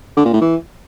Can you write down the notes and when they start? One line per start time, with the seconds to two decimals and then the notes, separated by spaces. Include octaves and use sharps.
0.17 D3
0.25 A#2
0.33 A2
0.41 E3